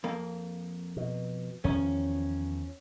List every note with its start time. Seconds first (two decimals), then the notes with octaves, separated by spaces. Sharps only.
0.04 F2 A#3
0.97 B2
1.64 E2 D#3 F3 C#4